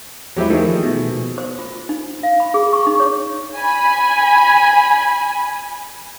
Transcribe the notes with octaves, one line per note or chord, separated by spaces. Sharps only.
E2 F#3 G#3 E4 G4 C5
D#3 F3 A3 G#4
B2
C5
F4
D#4
F5
B5
G#4
C#6
D#4
C#5
G#5 B5